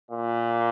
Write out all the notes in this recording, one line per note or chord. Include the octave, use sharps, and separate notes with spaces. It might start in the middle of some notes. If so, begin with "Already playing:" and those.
A#2